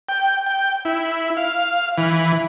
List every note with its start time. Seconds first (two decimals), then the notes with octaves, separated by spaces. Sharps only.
0.09 G5
0.46 G5
0.85 E4
1.37 F5
1.98 E3